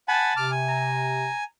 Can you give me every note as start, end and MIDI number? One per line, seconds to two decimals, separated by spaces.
0.08 0.33 78
0.08 0.33 80
0.08 0.46 81
0.08 0.33 83
0.37 1.29 48
0.37 0.51 86
0.37 0.51 89
0.51 1.44 80
0.68 1.43 82